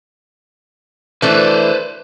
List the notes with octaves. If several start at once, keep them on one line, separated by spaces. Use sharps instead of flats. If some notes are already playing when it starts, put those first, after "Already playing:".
E3 A3 D4 B4 C5